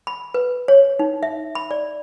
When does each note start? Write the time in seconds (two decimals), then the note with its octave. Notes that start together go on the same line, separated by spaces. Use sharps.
0.07 B5
0.34 B4
0.68 C#5
0.99 D#4
1.23 E5
1.55 B5
1.71 D5